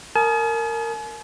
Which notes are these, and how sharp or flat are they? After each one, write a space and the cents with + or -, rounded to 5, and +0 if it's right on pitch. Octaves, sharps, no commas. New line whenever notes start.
A#4 -20 G#5 +45 D#6 +0